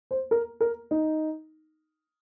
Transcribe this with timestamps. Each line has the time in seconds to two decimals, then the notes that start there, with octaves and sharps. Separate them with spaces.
0.11 C5
0.31 A#4
0.60 A#4
0.91 D#4